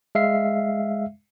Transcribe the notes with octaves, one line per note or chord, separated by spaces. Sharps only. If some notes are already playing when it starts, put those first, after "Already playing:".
G#3 E5 F5 C7